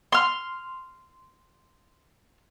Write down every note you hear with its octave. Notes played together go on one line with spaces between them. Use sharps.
C6 F6